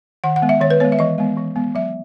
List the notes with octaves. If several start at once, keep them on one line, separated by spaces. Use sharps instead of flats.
D#3 F#5
F#5
G#3 B3
E5
D#3 C#5
B4
G#3 B3 C#5
E5
E3 D#5
G#3 B3
E3
G#3 B3
F#3 E5